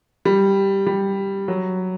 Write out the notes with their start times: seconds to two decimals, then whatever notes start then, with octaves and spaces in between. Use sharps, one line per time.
0.25 G3
0.87 G3
1.48 F#3